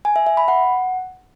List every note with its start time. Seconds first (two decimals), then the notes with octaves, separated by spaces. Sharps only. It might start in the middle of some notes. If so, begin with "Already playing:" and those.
0.05 G#5
0.16 E5
0.27 E5
0.37 B5
0.48 F#5